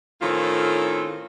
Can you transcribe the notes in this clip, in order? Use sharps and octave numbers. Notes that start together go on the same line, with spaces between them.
A2 D#3 C4 C#4 F4 A4